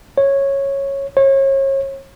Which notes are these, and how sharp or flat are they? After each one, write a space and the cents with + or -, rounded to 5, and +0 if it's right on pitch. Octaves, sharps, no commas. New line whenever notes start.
C#5 -10
C#5 -35